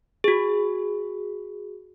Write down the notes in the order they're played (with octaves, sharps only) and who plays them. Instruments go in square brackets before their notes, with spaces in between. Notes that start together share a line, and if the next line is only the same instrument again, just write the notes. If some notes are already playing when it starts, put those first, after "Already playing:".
[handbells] F#4 G#4